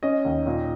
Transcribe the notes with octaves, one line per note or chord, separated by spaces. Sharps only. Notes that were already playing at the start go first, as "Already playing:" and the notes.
C#4 D#5
D#2
A#2